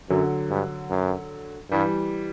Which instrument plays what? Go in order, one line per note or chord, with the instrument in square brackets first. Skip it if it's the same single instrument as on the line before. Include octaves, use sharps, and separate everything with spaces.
[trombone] F#2 [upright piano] D3 F#3
[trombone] G2
F#2
[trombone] G2 [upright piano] E3 G3